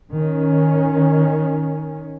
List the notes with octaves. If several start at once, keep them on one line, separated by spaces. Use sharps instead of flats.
D#3 C#4